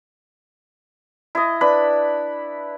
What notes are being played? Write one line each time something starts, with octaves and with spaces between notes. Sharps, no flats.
E4 D#5
D4 B4 B5